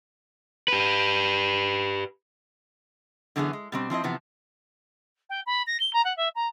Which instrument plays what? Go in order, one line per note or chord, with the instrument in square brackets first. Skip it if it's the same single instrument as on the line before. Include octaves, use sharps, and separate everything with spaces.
[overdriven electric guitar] G4 B4
[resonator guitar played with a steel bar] F#2 D3 E3 B3 C#4 G#4
G#3
B2 G3 C4
F3 C4 E4 D#5
C3 E3 F3 B3
[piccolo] G5
B5
A#6
G7
A#5
F#5
E5
A#5